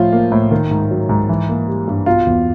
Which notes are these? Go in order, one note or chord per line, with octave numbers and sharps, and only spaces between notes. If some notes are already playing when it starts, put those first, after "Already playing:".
Already playing: A2 F3 F4
A#3
A2
D#3
G#2
F#3
G#2
E3
A#3
G3
G2
B2 F4
E2